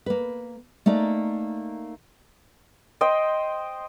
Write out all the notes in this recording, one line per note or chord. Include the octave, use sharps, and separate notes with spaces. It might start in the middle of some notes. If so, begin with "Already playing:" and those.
A#3 B4
A3 A#3 D#4 D5
C5 D#5 G5